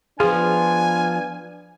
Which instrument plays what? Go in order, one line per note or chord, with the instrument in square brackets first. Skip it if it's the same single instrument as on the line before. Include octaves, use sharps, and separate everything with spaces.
[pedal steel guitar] F3 F4 [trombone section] B3 D4 B4 [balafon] G#4 [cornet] G#5